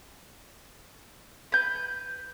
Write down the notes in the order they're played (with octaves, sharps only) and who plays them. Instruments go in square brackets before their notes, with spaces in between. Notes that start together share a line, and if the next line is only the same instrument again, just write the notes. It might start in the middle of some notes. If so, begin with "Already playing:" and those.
[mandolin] B4 G6